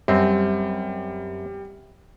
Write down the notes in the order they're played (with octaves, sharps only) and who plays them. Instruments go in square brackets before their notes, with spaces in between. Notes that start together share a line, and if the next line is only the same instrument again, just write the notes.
[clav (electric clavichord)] F#2 C4 E5 [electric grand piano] G3